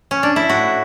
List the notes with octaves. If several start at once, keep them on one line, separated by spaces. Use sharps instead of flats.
C#4
D4
E4
A2 F#4